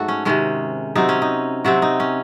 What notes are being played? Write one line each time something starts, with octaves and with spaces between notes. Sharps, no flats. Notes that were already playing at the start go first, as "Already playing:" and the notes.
Already playing: G#2 F#3 A3 F#4 A4
C#4
C3 D#3 G#3 C#4
C3 F#3 C4 D#4
C#4
D#4
C3 F#3 C4 F#4
D#4
C#4